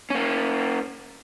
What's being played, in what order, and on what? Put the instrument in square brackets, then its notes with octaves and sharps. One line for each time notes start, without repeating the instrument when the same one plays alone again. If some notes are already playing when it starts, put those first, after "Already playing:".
[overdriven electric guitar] A#3 C#4